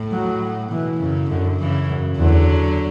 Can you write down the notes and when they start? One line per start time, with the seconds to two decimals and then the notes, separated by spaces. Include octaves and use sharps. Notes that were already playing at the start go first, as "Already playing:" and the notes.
Already playing: A2
0.12 F#3
0.72 B2 E3
1.00 F#2 C#3
1.30 F#2 D3
1.60 C#3 E3
1.90 F#2
2.18 E2 D3 F#3